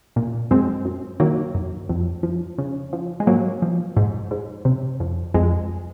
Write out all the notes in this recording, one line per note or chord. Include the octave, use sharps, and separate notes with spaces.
A#2
F#2 G#3 C4
F#2
D#3 F#3 A#3
F#2
F2
F3
C#3
F3
G#3
G#2 F#3 A#3
F3
G#2
G#2
C3
F2
F2 G#3